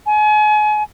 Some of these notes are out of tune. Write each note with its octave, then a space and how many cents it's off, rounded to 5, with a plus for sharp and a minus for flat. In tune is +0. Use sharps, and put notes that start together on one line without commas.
G#5 +35